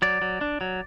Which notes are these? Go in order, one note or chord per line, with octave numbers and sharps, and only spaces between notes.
F#3 D5
F#3
D4
F#3